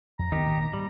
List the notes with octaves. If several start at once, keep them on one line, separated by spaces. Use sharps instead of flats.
F2 A#5
D2 D#3 F#3 B3 D#4 G4
G#1 A#2 A#3
G#2 G3